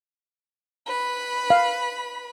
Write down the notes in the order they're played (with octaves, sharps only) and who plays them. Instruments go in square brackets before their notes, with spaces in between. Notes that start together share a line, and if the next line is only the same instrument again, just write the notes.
[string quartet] B4 B5
[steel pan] F5